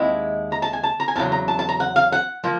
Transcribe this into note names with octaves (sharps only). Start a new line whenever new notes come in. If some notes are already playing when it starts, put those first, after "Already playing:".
Already playing: D#2 G#3 C4 E4
A#5
A5
G#5
A5
A#5
G#5
E2 C#3 F#3 A5
A#5
A5
A5
A#5
F#5
F5
F#5
F3 A#3